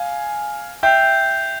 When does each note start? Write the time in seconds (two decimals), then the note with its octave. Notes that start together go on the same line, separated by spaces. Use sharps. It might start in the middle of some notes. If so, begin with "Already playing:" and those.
Already playing: F5 G#5
0.83 E5 G5 G6 C7 F7